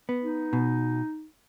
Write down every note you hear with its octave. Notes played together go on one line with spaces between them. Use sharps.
B3
D#4
B2